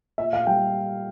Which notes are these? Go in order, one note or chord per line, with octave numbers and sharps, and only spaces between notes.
A#2 E5
F5
G3 G5